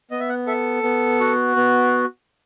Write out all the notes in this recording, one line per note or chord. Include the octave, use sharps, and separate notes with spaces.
B3 D#5
E5
F#5
A4 E5
B3
F#4
B3